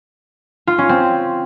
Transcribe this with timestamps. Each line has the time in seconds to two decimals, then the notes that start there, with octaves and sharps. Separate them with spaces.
0.67 F4
0.78 C#4
0.89 C4